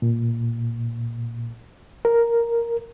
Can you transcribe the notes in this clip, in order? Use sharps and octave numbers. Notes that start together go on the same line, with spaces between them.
A#2
A#4